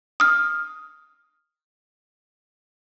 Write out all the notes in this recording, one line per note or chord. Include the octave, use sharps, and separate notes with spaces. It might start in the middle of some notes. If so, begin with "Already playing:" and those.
D#6 F6